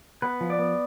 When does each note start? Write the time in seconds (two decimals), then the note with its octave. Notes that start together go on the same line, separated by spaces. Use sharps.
0.22 B3 B4
0.41 F3
0.50 D5
0.59 B3